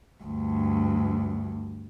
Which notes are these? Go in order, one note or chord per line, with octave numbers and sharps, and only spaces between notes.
D2 G2